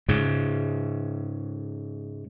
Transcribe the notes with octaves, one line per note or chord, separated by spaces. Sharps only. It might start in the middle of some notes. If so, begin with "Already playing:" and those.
G#2 C#3